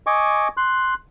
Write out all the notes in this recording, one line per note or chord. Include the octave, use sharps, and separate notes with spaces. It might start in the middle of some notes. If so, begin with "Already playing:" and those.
D#5 G#5 C#6 D6
C6 F#6